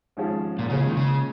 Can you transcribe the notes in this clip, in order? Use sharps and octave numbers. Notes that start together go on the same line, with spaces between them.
G#1 G#2 F3 C#4 G#4
A#2
A#2 C#3 G#3 F4 C#5 F5
D#3
C#3